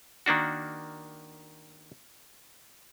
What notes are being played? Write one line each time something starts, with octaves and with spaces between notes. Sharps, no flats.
D#3 A#3 D4 F#4